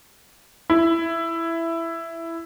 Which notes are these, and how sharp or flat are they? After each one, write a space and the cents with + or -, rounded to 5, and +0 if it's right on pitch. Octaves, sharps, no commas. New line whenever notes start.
E4 +10